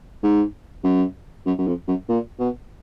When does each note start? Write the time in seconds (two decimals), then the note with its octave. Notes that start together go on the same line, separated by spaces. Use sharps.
0.23 G#2
0.84 F#2
1.46 F#2
1.58 F#2
1.67 F2
1.88 F#2
2.09 A#2
2.39 B2